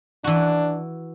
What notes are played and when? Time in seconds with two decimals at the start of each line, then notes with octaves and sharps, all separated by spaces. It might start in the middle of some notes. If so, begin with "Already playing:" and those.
0.24 E3 D4 F#4